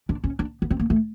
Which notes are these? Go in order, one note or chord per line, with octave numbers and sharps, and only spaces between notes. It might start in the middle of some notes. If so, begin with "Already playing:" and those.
D4
C#4
D4
B3
C4
A#3
A3